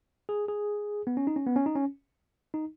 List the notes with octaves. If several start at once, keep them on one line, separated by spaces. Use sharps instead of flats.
G#4
G#4
B3
C#4
D#4
C#4
B3
C#4
D#4
C#4
D#4